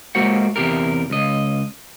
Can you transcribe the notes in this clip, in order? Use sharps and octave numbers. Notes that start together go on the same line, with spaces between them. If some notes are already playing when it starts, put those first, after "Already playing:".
G#3 A#3 F#4 C5 F#5
E2 C3 G4 A#4
C#2 D#5